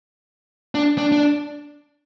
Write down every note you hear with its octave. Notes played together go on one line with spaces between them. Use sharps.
D4
D4
D4